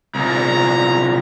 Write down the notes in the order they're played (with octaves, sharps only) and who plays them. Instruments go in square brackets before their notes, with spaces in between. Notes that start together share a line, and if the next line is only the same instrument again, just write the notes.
[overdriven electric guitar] C2 A#2 [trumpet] A#5